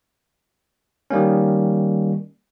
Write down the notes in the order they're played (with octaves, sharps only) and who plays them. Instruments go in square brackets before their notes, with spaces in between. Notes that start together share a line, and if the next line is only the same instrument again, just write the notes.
[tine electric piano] D#3 G3 A#3 C#4